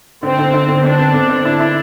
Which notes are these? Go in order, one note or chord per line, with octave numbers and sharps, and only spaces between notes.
D3 C4
D3
D3
D3
C4 D4
C4
D3
C4
D4 E4
E4